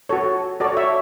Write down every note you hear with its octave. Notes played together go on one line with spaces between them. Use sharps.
F#4 A4 C#5
F#4 A4 C#5 D5
C#5 E5